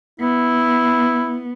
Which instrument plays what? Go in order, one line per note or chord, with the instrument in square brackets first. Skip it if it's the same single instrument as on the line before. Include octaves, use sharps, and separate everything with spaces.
[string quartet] B3 [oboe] E4